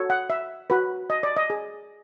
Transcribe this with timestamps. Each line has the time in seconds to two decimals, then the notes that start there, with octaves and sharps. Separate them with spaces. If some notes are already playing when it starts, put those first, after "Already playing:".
Already playing: F#4 A4 C#5
0.10 F#5
0.30 E5
0.70 F#4 B4
1.10 D#5
1.23 D5
1.36 D#5
1.50 G#4